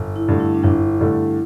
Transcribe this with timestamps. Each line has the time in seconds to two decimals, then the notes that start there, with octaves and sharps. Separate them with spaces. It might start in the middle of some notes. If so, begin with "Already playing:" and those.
Already playing: G1
0.16 E4
0.28 G2 D3 A3
0.40 E4
0.55 D4
0.63 G1 E4
1.00 G2 D3 A3